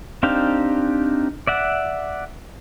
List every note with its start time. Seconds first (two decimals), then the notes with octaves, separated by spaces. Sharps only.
0.23 C4 D4 D#4 G4 F5
1.47 D5 E5 F#5